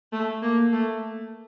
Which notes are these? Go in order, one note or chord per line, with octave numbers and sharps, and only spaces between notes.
A3
A#3
A3